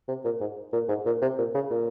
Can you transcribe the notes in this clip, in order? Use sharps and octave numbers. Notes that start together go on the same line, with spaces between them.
C3
A#2
G#2
A#2
G#2
A#2
C3
A#2
C#3
A#2